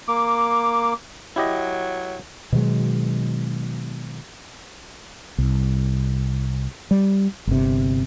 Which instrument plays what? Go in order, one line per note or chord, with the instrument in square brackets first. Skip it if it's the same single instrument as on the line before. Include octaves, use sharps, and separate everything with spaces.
[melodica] A#3 D6
[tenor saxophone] F#3 [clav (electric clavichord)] E4 G4 D#5
[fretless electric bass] B2 D#3 F#3 G#3
C2
G3
G1 C3